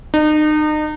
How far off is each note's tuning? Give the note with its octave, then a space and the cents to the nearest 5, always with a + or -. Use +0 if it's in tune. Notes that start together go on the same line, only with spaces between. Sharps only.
D#4 -35